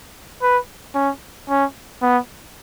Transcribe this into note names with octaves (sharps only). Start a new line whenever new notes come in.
B4
C#4
C#4
B3